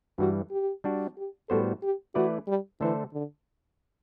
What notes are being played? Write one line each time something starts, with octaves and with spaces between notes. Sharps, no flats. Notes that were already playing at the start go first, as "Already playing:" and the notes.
G2 E3 G3 F#4
G4
G3 D4 F#4
G4
A2 G3 B3 F#4 A4 C5
G4
E3 A3 E4 F#4 B4 D5
G3
D3 E3 A3 D4 A4 C5
D3